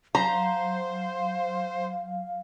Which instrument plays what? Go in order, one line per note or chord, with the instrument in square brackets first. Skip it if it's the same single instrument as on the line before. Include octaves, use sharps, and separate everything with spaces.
[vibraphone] F#3 [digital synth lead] C5 [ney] F5 [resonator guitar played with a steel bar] A#5